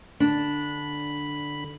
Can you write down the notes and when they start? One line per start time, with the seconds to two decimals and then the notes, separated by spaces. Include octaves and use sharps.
0.20 D3 D4 B5